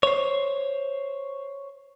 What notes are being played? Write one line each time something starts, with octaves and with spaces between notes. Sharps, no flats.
C5 C#5